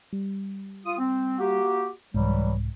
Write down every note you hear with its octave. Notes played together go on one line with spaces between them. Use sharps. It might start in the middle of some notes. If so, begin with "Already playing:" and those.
G3
F4 D#6
C4
A#3 F#4 G4
C2 G#2 E3 F#3 G3